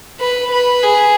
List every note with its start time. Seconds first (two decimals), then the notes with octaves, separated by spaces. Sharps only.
0.20 B4
0.51 B4
0.83 G#4